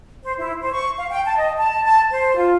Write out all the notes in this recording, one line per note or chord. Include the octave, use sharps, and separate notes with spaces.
C5
E4
C5
C#6
F5
G5
A5
D#5
A5
A5
C5
F4